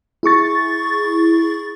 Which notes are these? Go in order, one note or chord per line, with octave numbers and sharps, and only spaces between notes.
E4 G#4 C#6 A6